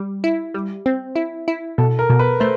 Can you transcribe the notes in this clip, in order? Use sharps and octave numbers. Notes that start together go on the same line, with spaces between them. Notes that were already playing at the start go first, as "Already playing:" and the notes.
Already playing: G3
E4
G3
C4
E4
E4
B2 A4
A#4
B2
B4
A3 C5